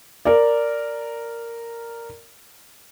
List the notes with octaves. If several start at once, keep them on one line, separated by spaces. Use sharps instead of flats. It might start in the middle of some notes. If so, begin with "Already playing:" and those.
A#4 D5